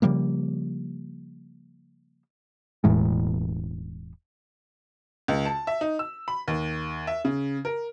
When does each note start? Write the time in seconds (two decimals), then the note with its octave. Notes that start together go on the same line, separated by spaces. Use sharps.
0.02 C#3 F3 G3 A#3
2.84 E1 A2 E3 G#3
5.28 C#2
5.45 A5
5.67 E5
5.81 D#4
5.99 E6
6.28 B5
6.48 D#2
7.07 E5
7.25 C#3
7.65 A#4